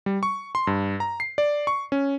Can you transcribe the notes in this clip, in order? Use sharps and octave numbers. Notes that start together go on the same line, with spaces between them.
G3
C#6
C6
G2
A#5
C7
D5
C#6
C#4